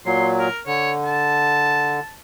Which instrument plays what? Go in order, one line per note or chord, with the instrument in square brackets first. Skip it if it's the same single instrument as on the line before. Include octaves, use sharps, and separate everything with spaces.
[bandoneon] A#2 F#3 [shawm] C6
[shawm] A#4
[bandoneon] D3 [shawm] C#5
[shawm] A5